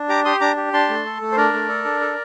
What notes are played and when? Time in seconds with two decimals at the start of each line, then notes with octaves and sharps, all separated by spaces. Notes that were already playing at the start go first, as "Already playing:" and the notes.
Already playing: D4
0.09 G4 A#5 D6
0.25 G4 C6 D#6
0.41 D4 A#5 D6
0.57 G4
0.73 D4 A5 C6
0.89 A3
1.06 A4
1.21 A3
1.32 C5
1.37 D4 A#4 D5
1.53 A3
1.68 A4
1.85 D4
2.01 A4